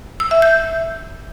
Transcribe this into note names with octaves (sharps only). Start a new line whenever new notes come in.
E6
E5
G6